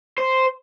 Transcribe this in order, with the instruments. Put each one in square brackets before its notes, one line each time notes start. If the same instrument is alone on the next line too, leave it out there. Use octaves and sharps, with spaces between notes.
[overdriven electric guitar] C5